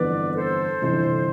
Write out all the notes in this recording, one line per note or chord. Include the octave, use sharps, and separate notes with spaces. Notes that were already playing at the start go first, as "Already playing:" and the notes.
Already playing: G1 F2 E3 B3 B4 D5
A4 C5
G1 F2 C3 E3